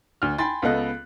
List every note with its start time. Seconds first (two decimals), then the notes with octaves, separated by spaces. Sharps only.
0.22 D2 F6
0.38 G5 G#5 B5 C6 A6
0.62 C#2 B3 A4 D#5 F#6